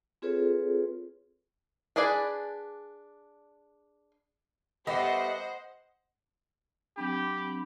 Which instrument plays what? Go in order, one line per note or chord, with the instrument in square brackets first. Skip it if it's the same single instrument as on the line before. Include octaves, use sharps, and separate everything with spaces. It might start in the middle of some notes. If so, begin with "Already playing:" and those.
[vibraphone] C4 F4 G#4 A4 B4 C#5
[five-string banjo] D4 G#4 B4 D5 G#5
[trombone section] G3 A3 G4 [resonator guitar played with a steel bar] B3 [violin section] C5 F#5 [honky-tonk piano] D#5
[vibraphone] F#3 C4 D4 [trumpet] G4 [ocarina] B5